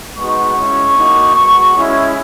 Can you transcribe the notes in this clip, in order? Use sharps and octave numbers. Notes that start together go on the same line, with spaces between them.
G#3 B3 D#4 F#4 C#6
G#3 C#4 E4
A#3 D#4 F#4
G#3 B3 F#4 C#6
G#3 C#4 E4